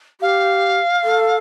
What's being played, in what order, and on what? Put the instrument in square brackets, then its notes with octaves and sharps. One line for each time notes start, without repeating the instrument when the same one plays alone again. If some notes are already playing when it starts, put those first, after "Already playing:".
[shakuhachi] G4 [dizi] F5
[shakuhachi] A4